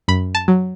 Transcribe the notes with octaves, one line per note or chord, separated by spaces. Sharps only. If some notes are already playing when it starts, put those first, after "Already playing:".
F#2 B5
A5
F#3